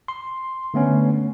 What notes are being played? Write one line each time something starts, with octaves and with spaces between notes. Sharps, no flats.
C6
D3 A3 B3 C#4